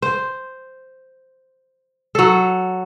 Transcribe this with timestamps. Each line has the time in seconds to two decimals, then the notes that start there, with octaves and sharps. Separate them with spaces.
0.02 C5
2.15 F#3 A4